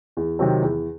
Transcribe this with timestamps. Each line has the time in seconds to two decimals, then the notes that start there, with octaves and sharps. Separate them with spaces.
0.17 E2
0.39 C3 D#3 F#3 C4
0.62 E2